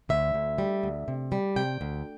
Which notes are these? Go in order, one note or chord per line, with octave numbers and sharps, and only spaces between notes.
D2 E5
D2
G3
D2
C3
G3
C3 G5
D2